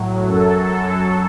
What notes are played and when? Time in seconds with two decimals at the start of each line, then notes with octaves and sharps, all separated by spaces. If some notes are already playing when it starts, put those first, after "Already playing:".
Already playing: A2 F#3
0.27 F#2 F#3 A4